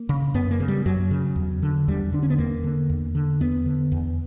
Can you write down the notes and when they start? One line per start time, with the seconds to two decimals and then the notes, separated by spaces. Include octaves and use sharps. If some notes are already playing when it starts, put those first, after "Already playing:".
Already playing: A#3
0.09 C#3
0.34 F#2 B3
0.51 A#3
0.60 C#3
0.68 G3
0.86 F#2 F#3
1.11 C#3
1.36 E2
1.62 D3
1.88 E2 G3
2.12 D3 D4
2.23 C#4
2.30 B3
2.38 E2 A#3
2.64 D3
2.90 E2
3.15 D3
3.40 E2 B3
3.66 D3
3.92 E2